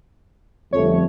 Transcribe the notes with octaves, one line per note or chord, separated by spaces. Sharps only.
G1 F2 A3 C#5